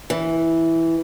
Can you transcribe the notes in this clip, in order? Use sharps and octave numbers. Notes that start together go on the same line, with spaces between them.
E3